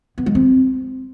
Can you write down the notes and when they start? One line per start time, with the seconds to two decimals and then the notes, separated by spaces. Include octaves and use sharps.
0.18 B3
0.26 G#3
0.35 C4